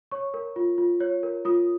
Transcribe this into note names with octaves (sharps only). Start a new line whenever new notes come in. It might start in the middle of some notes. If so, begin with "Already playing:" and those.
C#5 C#6
A#4
F4
F4
C#5
A#4
F4 D#6